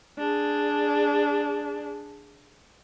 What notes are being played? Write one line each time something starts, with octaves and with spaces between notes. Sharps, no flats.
D4 G#4